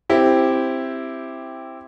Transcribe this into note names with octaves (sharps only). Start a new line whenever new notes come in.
C4 E4 G4